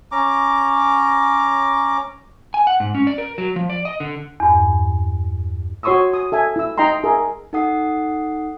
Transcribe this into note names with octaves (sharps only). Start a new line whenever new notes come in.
C#4 A#5 D6
G#5
F#5
G#2
C#4
D5
A#4
F#3
F3
D5
D#5
D3
E2 G2
F#4 C#5 C6 C#6 D#6 E6
D#6
A4 E5 G#5
E4 E6
D#4 D#5 G5 A#5 C6
G#4 A#4 E5
D#4 A4 F#5 D#6 C7